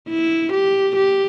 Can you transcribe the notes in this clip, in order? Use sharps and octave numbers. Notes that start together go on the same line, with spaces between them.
E4
G4
G4